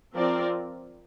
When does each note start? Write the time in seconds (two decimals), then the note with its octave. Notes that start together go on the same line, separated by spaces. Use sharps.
0.14 F3 C4 F4 A#4 D5